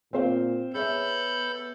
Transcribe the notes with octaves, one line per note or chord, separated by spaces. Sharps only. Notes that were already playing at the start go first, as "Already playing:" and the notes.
A#2 C4 C5 F5
B3 G#4 A4 C#5 E5 B5 G6